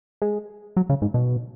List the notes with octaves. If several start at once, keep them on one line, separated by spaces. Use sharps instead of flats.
G#3
F#3
C#3
G#2
B2